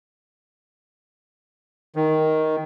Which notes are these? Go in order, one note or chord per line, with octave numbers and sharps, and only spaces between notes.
D#3